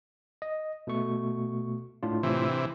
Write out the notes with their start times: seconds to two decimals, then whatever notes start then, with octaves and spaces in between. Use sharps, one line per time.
0.42 D#5
0.87 B2 A3 C#6
2.03 A2 D4 F4
2.23 C3 E3